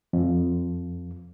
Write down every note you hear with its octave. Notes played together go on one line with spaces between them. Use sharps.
F2